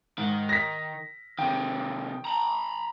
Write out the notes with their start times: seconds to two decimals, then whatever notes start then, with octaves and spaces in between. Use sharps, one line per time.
0.18 G#2 D#3
0.49 A#6 B6
1.39 C3 D#3 G5
2.25 A#5 B5